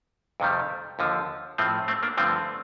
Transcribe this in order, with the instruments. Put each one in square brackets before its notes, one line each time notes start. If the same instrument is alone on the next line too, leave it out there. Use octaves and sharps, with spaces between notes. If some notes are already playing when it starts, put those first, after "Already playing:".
[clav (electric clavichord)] F2 C3 D#3 G3
D#2 D3 F3
A2 F3 A3 C4
A3 C4
A#3 D4
G2 D3 F3 A3 C4